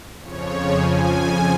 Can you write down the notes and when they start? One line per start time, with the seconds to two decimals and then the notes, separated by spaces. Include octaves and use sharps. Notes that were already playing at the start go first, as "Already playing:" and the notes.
0.23 F2 C#3 F3 C#5
0.71 G#5